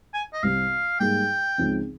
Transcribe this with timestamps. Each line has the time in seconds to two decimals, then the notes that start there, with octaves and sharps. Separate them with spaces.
0.14 G#5
0.33 D#5
0.43 C2 C3 G3 C4 F5
1.00 G#2 G3 A#3 D#4 G#4 G5
1.58 C#2 C#3 F3 C4 D#4